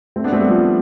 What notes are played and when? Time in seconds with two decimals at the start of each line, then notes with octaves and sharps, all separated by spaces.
0.16 A3 C4
0.24 B3 D4
0.33 A3 C4
0.40 G3 B3
0.49 F3 A3